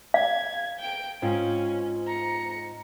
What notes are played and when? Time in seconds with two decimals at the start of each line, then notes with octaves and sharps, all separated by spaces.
0.14 F5 G#6
0.79 G5 D7
1.22 G#2 C4 C#4 F4
2.06 A#5 C#7